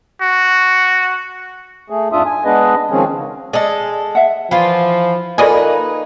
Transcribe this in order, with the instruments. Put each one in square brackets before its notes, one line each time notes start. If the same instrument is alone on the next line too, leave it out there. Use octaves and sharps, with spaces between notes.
[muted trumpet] F#4
[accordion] A3 G#4
F2 G#2 D4 F4 E5 D#6
G#5
G#3 B3 D4 G#4 B4 D#5
D#3 F3 G#3 C4 C#4 G#4
C#3
[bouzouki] G#3 A4 [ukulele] D5 D#5
[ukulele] E5 F#5
[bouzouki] E3 F4 [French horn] F3
[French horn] A#3 [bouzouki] D#4 B4 [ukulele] F4 A4 [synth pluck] D5 D#5 G#5